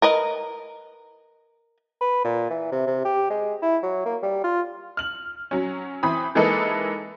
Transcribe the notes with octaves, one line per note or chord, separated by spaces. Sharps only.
A#4 B4 D#5
B4
A#2
E3
C3
C3
G4
G#3
E4
F#3
A#3
G3
F4
F6 F#7
F#3 C#4
E3 C4 B5 D#6
E3 G#3 A#3 D#4 A4 B4